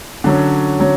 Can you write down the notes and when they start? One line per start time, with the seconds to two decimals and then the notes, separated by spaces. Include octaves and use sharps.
0.24 D3 F#3 C#4
0.80 D3 F#3 C#4